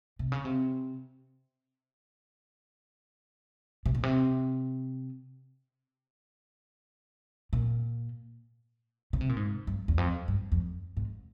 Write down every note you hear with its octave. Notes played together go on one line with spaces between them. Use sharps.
C3
C#3
C3
C3
A#2
C3
A#2
C#3
C3
A#2
G#2
G2
E2
F2
G2
F2
G#2